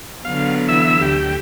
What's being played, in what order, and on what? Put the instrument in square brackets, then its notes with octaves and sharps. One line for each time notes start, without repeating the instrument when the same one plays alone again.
[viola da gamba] D3 F#3 B3 [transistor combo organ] F5
[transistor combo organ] E3 E5 E6
[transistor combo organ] D2 G5 [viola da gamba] G4